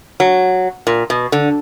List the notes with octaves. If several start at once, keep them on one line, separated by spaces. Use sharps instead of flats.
F#3
A#2
B2
D3